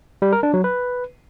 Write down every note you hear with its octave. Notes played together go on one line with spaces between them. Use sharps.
G3
A#4
D4
F#3
B4